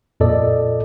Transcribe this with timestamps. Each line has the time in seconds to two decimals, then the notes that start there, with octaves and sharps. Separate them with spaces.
0.20 F2 A#2 A4 D5 D#5